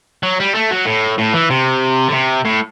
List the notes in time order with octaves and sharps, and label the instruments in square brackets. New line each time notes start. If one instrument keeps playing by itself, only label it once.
[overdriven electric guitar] F#3
G3
A3
F#3
A2
A2
E3
C3
D3
C3
A2